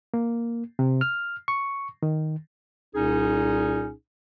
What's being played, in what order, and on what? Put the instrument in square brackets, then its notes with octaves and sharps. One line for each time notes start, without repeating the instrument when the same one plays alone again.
[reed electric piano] A#3
C3
F6
C#6
D#3
[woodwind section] C2 A#2 C#4 D#4 G#4